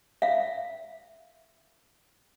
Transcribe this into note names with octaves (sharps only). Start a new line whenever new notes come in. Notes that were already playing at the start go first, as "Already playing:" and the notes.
E5 F5